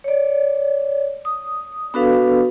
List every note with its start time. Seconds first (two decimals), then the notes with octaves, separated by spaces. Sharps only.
0.04 C#5 D5
1.25 D#6
1.94 B3 D4 F#4 A4 B4 F5